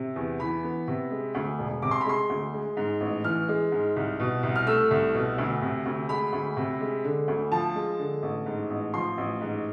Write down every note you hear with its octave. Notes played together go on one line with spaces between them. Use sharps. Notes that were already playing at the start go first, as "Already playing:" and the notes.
Already playing: C3
E2
E3 B5
B3
C3
G#3
D2
E1
C3 D6
C6
B5
G#3 C6
D2
G#3
G#2
A1
E3 F6
G#3
G#2
C2
B2
C2
F6
A3 E6
C2
B2
D2
C3
D2
G#3 B5
D2
C3
G#3
D3
D2
F3 A5
G#3
D3
A1
G#2
A1
F3 C6
A1
G#2